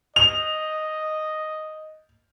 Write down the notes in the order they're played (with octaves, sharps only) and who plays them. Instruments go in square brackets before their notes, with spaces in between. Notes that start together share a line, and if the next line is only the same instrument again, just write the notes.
[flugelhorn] D#5 [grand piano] F7